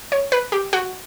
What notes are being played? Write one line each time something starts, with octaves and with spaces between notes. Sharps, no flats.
C#5
B4
G4
F#4